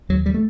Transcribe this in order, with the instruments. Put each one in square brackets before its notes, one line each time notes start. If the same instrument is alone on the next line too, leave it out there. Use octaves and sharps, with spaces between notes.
[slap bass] D#2 F#3
G3
A3